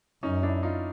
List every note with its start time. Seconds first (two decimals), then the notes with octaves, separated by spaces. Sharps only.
0.23 F#2 C#4 D#4
0.43 D4 E4
0.62 D#4 F4